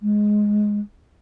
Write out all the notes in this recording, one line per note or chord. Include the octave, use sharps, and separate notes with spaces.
G#3